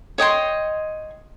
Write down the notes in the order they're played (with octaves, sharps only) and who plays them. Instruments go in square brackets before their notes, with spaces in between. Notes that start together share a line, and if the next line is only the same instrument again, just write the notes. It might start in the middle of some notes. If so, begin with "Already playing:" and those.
[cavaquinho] C#5 D#5 G5 C6